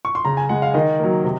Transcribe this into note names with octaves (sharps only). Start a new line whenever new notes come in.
C#6
C6
C#3 A#5
G#5
G#3 F#5
F5
D#3 D#5
F#3 A#3
C3